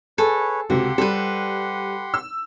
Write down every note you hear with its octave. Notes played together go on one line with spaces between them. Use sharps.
G#4 A4 B4 C#5
C#2 C3 F#4 G4 F#5 C6
G3 A4 B4 C5
E6